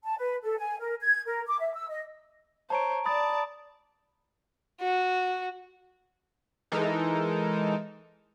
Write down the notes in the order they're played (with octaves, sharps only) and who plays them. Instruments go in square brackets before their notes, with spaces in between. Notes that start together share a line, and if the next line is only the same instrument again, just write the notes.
[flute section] A5
B4
A4
G#5
A#4
G#6
A#4
D6
E5
E6
D#5
[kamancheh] C5 C#5 [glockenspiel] A5 A#5 D7
[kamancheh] D5 A5 [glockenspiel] B5 D#6 A6
[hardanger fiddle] F#4
[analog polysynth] E3 G#3 D#4 A4 A#4